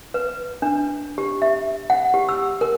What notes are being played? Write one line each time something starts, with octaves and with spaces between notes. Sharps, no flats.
B4
D4
G4
E5
F#5
G4
E6
A#4